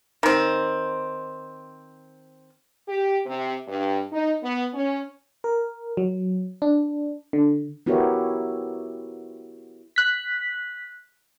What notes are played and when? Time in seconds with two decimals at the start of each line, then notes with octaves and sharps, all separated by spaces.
0.23 D#3 C4
2.88 G4
3.26 C3
3.68 G2
4.12 D#4
4.42 B3
4.74 C#4
5.44 A#4
5.97 F#3
6.62 D4
7.33 D3
7.86 B3 E4 F#4 G4 A#4 C#5
9.96 F#6 B6